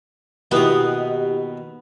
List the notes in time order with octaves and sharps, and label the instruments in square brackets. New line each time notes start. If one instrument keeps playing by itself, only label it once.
[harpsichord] D#2 B2 D#6 [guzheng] B3 [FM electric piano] E4 G4 D#5